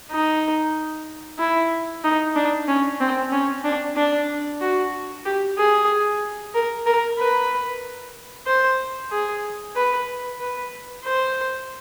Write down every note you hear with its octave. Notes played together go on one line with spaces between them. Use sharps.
D#4
E4
D#4
D4
C#4
C4
C#4
D4
D4
F#4
G4
G#4
A#4
A#4
B4
C5
G#4
B4
B4
C5